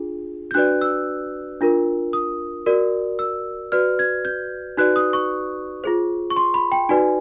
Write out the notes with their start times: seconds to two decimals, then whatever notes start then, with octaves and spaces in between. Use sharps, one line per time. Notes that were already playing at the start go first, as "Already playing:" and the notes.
Already playing: D4 F4 G#4
0.51 G6
0.54 D4 F#4 B4 D5 F#6
0.81 E6
1.61 D4 F4 A#4
2.13 D#6
2.66 F#4 A#4 D5
3.19 E6
3.72 F#4 B4 D5 F6
3.99 G#6
4.25 G6
4.77 D#4 F#4 B4 D5 F#6
4.96 D#6
5.13 C#6
5.84 F4 G#4 C5
6.30 C#6
6.36 C6
6.54 B5
6.72 G5
6.89 D#4 F#4 B4 D5 G#5